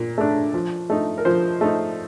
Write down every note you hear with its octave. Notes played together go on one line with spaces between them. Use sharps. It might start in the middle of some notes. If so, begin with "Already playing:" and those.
Already playing: A#2
A3 D4
F3
A3 D#4
A#4
F3 C5
A3 D#4